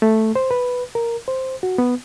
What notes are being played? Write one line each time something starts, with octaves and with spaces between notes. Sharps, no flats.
A3
C5
B4
A#4
C5
F#4
B3